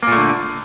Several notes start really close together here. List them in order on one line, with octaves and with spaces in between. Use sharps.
A#3 A#2 A3 D3